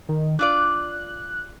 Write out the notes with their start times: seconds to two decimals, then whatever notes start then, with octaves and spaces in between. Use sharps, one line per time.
0.09 D#3
0.39 D4 F4 D5 F#6